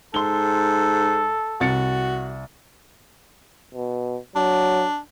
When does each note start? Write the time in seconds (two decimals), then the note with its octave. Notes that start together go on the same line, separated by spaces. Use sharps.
0.14 G#2 A4 C6 G7
1.61 C2 F#4 A6 C#7
3.74 B2
4.36 F#3 D4